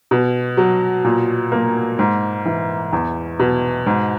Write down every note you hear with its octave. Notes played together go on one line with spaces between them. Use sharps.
B2
F#3
A#2
A#3
G#2
E3
E2
B2
G#2